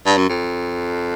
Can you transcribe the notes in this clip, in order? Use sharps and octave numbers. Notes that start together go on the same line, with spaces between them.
G2
F#2
F2